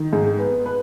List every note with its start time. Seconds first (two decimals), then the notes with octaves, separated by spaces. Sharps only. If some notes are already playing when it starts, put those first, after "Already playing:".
Already playing: D#3
0.13 G#2
0.39 B3
0.66 B4